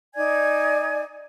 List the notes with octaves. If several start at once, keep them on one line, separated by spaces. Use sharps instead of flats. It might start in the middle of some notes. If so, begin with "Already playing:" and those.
D#4 D5 G#5 G#6